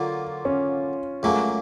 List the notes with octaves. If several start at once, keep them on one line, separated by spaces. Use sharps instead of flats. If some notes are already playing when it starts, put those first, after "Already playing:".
Already playing: D3 F#3 A#3 F4
C#4
C#2 C#3 F#3 A3 A#3